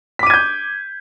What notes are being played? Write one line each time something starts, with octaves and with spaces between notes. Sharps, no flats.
D6 G6 G#6 B6 D#7